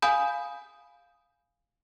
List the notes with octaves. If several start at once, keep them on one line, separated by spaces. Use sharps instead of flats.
F5 G#5 B5 D#6 G6